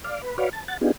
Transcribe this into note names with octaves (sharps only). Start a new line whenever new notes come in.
D5 F5
B4
F#4 B4 C#5 D5 F5
A5
F#5 A6
B3 D4 D#4 F4 G4 G#4